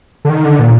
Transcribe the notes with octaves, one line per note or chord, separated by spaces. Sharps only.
D3
D#3
D3
A#2